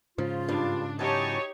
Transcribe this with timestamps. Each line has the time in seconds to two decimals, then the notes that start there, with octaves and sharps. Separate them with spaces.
0.18 G#2 C#3 F3 F4
0.48 G2 D4
0.99 E3 F#3 D#4 G4 C#5 D#5 G#5 A5